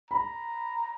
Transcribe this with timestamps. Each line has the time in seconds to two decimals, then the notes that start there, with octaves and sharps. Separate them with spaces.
0.11 A#5 B5